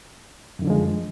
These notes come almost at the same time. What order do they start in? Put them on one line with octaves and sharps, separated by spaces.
F#2 D#3 D3 F3 G#3